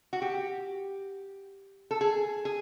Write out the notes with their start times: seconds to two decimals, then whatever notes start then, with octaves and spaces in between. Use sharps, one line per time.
0.13 F#4
0.22 G4
1.91 A4
2.01 G#4
2.45 G#4